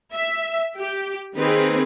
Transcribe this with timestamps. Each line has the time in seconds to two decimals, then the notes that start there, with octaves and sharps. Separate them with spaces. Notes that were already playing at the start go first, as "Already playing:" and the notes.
0.14 E5
0.78 G4
1.36 D#3 A#3 C4 D#4 G#4 B4